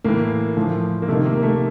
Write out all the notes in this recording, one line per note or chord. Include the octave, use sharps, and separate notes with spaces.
A2 E3 A#3
A2 F3
A#3
C3 D#3 A3
A#3
A3